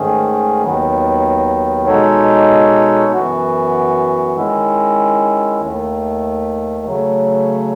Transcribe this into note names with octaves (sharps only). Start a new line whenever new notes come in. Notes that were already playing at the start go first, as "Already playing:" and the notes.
Already playing: G#2 D#3 A3 C#4 G#4
D#2 D#3 F#3 B3
B2 G#3 D#4 A4 C#5
F#2 E3 B3 F#4
D#3 G#3 C#4 E4
D#2 D#3 A3
C#3 F#3 A3